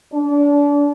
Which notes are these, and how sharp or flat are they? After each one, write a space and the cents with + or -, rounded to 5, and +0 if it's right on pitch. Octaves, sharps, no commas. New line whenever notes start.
D4 -30